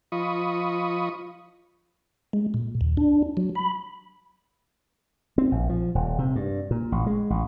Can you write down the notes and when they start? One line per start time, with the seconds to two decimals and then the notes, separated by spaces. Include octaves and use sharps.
0.12 F3 F4 D#5 B5 C#6 D#6
2.33 G#3
2.54 A#2
2.81 D#2
2.97 D4
3.37 F#3
3.55 B5
5.38 C4
5.52 A#1
5.69 F3
5.95 D#1
6.19 C3
6.36 G2
6.71 A#2
6.92 A1
7.06 G#3
7.30 A1